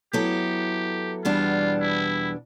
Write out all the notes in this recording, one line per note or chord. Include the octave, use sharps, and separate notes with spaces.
F#3 B3 E4 G4 A4
E2 B2 G3 B3 D4 F4
E4